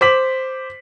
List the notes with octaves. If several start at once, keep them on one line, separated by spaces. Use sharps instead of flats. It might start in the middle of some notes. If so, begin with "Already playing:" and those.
C5 D6 B6 F#7